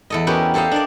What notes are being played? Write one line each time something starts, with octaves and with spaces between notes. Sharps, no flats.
E2 A4 D#5
B3 C#4 F#4 G4 A#4
G4 A4 C5 D#5 F5
D4 A#4 D5